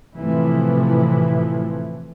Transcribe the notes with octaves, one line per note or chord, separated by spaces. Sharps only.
A2 C3 E3 F3